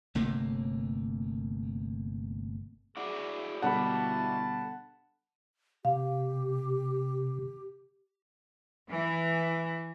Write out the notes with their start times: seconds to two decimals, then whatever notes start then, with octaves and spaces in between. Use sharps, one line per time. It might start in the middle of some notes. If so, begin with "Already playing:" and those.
0.15 G1 C3 A3 A#3
2.97 E4 F#4 G#4 D5
3.62 B2 D3 G3 F#5 A5 B5
5.85 C3 G4 F5
8.89 E3